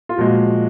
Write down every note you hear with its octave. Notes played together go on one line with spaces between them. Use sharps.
F4
A#2 F3 G#3 F#4